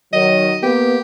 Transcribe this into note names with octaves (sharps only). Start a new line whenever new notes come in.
D#3 F#3 D#5
A#3 B3 G4